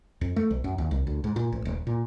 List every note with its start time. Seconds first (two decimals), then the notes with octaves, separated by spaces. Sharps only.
0.21 F2
0.36 A3
0.51 B1
0.64 F#2
0.78 D#2
0.91 C2
1.07 D2
1.24 G#2
1.36 A#2
1.52 A1
1.65 D#1
1.87 A#2